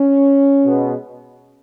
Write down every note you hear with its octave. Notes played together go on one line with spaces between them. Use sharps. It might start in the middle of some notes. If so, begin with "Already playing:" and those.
Already playing: C#4
B2 G#3 B3